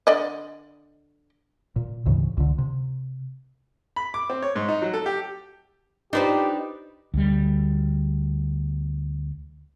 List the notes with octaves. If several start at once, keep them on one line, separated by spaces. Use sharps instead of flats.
D3 D5 D#5
A#2
D2 G#2 C#3 E3
C#2 D3
C3
B5
D6
C4
C#5
G#2
D#4
F#3
A4
G4
D4 D#4 F4 G4 B4 C5
D2 G3